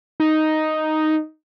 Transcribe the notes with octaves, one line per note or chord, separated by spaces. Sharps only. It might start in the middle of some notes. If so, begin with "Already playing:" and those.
D#4